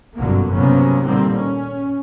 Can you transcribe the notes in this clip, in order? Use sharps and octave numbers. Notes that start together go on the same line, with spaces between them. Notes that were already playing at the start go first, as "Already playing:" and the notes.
G1 F#2 B2 D3 F#3 A#3
C3 F#3 A#3 B3 C#4
A#2 D3 D#3 G3 A#3 C4
C#4